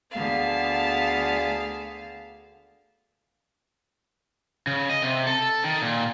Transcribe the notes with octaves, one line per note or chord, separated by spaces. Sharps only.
D2 D3 B3 G#4 F5 A5
C#3
D#5
C3
A4
D#3
A#2